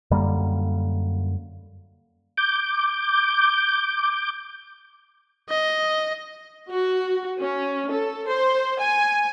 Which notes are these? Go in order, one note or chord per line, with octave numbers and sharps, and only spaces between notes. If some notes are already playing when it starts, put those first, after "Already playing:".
F#2 D3 G3 A#3
D6 G6
D#5
F#4
C#4
A4
C5
G#5